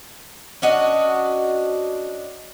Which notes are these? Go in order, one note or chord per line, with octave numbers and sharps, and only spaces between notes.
C#4 D4 F#4 D#5